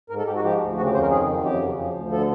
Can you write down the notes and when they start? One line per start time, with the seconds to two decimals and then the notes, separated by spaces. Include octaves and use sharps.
0.10 G#2 A#4
0.18 A4
0.26 G#2 G4
0.36 F#4
0.43 F3 G4
0.61 D2
0.77 C#3 F#4
0.85 G4
0.94 F2 C5
1.02 A#4
1.10 D#3 G#4
1.28 F#2
1.45 F2 G4
1.62 C#3
1.79 F3
1.95 D2
2.12 D3 A4